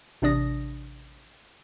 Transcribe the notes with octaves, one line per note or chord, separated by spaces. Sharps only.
A1 C3 D4 D5 D#6 A#6